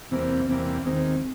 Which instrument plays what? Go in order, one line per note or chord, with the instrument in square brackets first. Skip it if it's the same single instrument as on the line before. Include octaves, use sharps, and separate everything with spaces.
[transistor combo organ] E2 C3 E3 G3 A#3 [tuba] C4
[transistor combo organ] E2 C3 E3 G3 A#3 [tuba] C4
[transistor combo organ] D#2 D#3 G#3 [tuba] C4